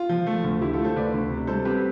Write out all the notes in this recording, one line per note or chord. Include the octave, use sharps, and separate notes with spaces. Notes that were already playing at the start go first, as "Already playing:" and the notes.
Already playing: F4
F3
A3
D2
D3 E4 G4
F4 A4
A3
A4 C5
D2 B4 D5
D2
C3
G3 A4 C5
C4 G4 B4